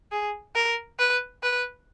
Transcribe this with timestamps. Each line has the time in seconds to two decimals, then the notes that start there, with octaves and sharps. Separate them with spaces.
0.12 G#4
0.55 A#4
0.99 B4
1.43 B4